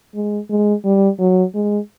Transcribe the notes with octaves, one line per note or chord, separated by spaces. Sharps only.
G#3
G#3
G3
F#3
G#3